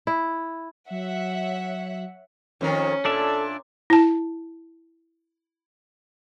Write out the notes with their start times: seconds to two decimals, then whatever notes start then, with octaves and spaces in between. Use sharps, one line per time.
0.07 E4
0.90 F#3 C#5 E5 F#5
2.61 F2 D#3 C#4 A#4
3.05 A#2 D4 A4 D5 E5
3.90 E4 A5